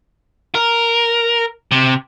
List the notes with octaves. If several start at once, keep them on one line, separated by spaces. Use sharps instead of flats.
A#4
C3